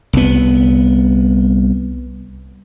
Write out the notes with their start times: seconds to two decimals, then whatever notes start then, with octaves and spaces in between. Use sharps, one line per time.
0.13 C2 B3